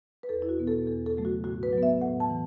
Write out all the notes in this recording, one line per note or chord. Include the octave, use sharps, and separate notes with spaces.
B4
E2 A4
E4
F#4
B2 B3
A4
E2 A4
A4
C#3 F#3 A3
F#4
A2 F#4
B4
F#3
B3 E5
A2 F#5
A5
E3